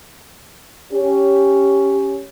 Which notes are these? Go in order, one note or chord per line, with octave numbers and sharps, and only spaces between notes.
C#4 G4